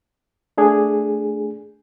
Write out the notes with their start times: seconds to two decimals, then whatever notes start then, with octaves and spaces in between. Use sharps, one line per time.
0.57 A3 D4 G#4